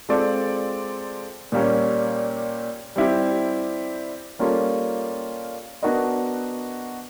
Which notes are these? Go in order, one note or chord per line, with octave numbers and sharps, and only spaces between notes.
G#3 C4 F4 A4 D5
A#2 G3 A#3 C#4
G3 C4 E4 G4
G3 A#3 C#4 F4 A4
B3 D4 F#4 A#4 D#5